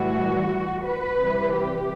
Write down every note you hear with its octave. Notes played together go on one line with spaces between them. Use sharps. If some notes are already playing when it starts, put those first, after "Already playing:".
Already playing: A2 E3 G3 F#4
B4
C3 E3 G3
G4